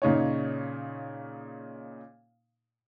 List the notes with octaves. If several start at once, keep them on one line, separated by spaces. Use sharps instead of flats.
A#2 C#3 D#4 C#5